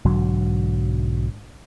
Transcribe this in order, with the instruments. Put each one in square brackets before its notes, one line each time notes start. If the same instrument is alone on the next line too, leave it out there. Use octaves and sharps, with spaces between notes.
[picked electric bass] B1 G#2 D3 F#3